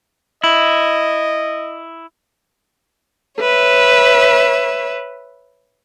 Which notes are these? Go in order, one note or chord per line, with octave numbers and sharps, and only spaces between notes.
E4 D#5
B4 C#5 E5